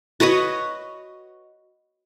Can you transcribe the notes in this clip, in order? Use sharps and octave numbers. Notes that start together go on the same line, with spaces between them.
F#4 B4 C#5 D#5